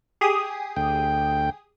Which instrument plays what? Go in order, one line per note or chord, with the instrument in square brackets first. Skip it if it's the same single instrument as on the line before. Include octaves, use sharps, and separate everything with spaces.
[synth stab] G4 G#4 D#6
[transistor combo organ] D2 G5